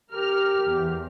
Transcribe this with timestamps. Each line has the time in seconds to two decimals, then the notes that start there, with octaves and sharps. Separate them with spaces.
0.12 G4 A#4 F6
0.64 E2